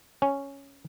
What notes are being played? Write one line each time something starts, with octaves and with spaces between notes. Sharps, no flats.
C#4